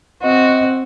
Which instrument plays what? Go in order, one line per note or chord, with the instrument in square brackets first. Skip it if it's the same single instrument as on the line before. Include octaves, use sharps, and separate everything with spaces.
[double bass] C4 [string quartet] F#4 [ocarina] D#5